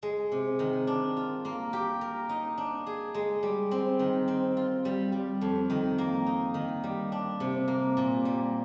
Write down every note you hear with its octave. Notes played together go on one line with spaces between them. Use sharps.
G#3
C3
D#3
D4
F4
A#3
G4
A#4
D#4
D4
G#4
G#3
G3
C4
D#3
C4
F4
G3
G3
F2
D#3
A#3
D#4
D#3
G3
D4
C3
A#3
A#2
G3